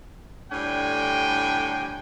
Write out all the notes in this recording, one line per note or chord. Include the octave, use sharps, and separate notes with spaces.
A2 D3 G3 D4 G5 G#5